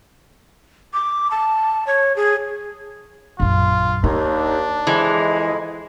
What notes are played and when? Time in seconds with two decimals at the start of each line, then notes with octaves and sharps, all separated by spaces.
0.93 D6
1.31 A5
1.87 C#5
2.16 G#4
3.40 A#1 F#2 F4
4.04 D#2 D4 D#4
4.87 F2 E3 G#3